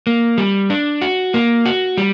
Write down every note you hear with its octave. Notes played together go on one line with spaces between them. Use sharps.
A#3
G3
D4
F#4
A#3
F#4
G3